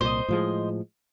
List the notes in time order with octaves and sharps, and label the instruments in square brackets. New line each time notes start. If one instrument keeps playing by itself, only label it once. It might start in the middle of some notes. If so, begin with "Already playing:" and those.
[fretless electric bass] C2 A#2 [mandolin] C5 D#5
[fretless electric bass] A2 F3 G#3